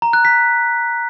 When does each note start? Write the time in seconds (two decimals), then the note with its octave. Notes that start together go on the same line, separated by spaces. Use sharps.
0.02 A#5
0.13 F#6
0.25 B6